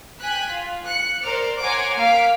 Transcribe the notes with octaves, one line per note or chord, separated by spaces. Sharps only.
G5 G#5 F#6 B6
F4
F#6 C#7
A#4 C5 D5 F6
C#5 F#5 G#5 A#5 C6 D6
A#3 F5 F6 B6 D7